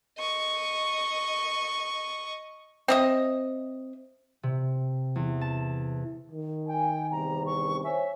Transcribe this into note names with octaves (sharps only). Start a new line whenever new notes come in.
D#5 C#6
C4 D#5 E5
C3
E2
A5
D#3
G5 G#5
E2 G2 C3 A#5
C#6
C5 C#5 E5 G#5